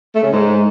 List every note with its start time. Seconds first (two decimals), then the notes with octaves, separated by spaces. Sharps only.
0.15 A3
0.23 C#3
0.32 G#2